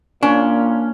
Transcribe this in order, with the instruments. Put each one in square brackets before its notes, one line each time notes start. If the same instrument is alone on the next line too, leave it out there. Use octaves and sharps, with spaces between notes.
[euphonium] A#2 [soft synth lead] A#3 [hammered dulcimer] C#4 [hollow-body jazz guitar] D4